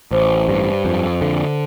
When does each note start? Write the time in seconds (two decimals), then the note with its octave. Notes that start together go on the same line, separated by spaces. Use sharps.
0.11 A1 C5
0.49 G2
0.85 F2
1.22 D3